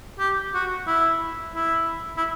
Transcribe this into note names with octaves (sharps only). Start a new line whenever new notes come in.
G4
F#4
E4
E4
E4